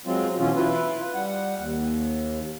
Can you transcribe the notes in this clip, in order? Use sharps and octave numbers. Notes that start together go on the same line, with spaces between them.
F#3 G#3 C4 F4
B2 E3 F#3 C#4 F4
E4 F4 B4
G3 F#5
D#2